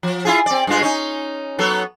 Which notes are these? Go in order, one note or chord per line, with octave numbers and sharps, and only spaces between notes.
F3
E4 F4 G#4
C4 D5
G2 G#3 F4
C#4 D#4
F#3 B3 A4